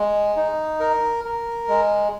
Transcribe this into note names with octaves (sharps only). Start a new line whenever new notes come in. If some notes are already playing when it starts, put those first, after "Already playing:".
Already playing: G#3
D#4
A#4
A#4
G#3